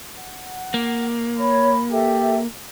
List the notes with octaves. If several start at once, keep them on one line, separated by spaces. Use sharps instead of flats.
F#5
A#3
C#5 B5
G4 A4 E5